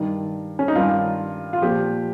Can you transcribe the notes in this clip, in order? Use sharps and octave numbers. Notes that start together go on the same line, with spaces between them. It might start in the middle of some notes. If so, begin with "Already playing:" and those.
Already playing: G2 D#3
C#4
D#4
G2 D#3 F4
F4
A#2 F3 G4